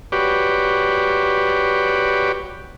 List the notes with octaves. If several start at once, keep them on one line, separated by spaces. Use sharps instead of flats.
F#4 G4 B4 C#5 D5